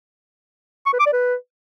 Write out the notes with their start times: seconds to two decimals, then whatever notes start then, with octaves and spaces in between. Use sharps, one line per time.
0.86 C#6
0.93 B4
1.00 D6
1.06 D5
1.13 B4